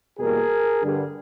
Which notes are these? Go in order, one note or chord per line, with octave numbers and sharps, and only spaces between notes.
E2 B2 G3 A#3 G#4 A#4
G2 D3 G3